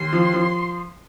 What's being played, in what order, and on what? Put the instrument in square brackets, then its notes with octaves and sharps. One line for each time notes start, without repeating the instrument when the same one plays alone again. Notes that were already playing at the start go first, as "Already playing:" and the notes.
Already playing: [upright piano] D#2 [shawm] C6
[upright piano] F3
F3